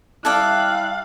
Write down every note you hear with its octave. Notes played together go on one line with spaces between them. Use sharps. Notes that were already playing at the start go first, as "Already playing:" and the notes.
G3 E4 A4 D5 F5 G5 F#6